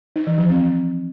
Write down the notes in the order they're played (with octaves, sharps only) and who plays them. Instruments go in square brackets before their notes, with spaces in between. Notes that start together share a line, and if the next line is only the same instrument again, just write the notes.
[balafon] D#4
E3
F3
C4